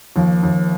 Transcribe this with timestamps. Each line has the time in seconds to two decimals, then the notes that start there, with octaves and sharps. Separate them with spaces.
0.16 D#2 F3
0.43 D#2